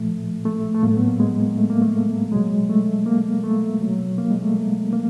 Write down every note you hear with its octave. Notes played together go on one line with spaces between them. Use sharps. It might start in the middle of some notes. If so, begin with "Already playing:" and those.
Already playing: A#2 F3 A3
A3
A3
A2 F#3 A#3
B3
A#3
G#3
A3
A#3
A3
B2 F#3 G#3
A3
A#3
A3
B2 F#3
A#3
G#3
A3
A#3